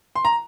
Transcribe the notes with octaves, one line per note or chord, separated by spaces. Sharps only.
C6
A#5